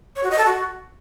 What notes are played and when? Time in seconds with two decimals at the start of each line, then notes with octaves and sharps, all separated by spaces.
0.16 C#5
0.23 F#4
0.31 D#5
0.38 A4
0.45 F#4